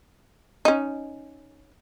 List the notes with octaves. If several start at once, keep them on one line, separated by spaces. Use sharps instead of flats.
C#4 D#4